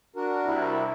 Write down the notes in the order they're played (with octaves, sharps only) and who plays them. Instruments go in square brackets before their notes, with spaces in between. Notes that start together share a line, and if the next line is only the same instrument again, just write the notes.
[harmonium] D4 F#4 A#4
[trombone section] C2 E4